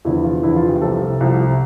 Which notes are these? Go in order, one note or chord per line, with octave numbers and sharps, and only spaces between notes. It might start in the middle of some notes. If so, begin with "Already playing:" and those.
E2 D3 F3 E4
F4
E2 D3 F3 E4
F4
G4
C2 C3 F3 A4
C2 C3 F3